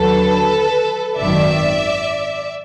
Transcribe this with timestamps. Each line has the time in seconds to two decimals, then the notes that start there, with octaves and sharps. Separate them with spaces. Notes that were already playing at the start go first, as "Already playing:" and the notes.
Already playing: D#2 D3 F#3 A4 B4
1.17 G#1 F#2 D#3 D5 E5